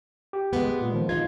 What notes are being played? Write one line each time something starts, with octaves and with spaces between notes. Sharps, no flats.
G4
G#3 B3
A#2
D#3 F3
D#4 F4 G#6